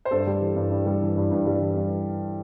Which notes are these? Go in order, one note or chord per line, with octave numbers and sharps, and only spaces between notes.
C5
G2 A4
G3
E3
G2
G2
G3
E3
G2
G2
G3
E3
G2